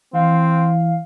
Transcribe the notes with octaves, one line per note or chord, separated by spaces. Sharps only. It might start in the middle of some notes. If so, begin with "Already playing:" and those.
E3 C4 F5